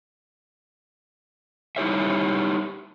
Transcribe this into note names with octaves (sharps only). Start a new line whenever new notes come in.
G3 D#4 E4 G4 C#5 E5